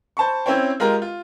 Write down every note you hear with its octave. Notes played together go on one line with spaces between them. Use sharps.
C5 A5 B5 C#6
C4 C#4 E4 C5 C#5 G5
G#3 F4 G4 A#4
F4